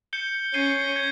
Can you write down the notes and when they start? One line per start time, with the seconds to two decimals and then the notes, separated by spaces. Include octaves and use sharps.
0.13 G6 C#7 G7
0.54 C#4 G#6 C7 D#7 G7
0.96 G#6